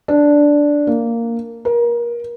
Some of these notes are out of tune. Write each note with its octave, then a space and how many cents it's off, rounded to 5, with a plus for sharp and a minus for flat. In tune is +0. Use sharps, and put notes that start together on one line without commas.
D4 -5
A#3 -10
A#4 +25